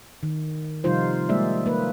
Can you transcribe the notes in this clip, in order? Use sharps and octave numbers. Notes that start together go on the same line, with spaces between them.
D#3
C3 F3 G3 D#4 F4 C5
G3 G#3 A#3 G#4 D5 E5
A#3 B4